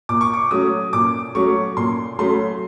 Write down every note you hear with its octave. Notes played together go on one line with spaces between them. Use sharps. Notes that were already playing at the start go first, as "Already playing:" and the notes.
A#2 D6
C#6
D6
F#3 A3 C#4 D#6
A#2 D6
F#3 A3 C#4 C#6
A#2 C6
F#3 A3 C#4 C6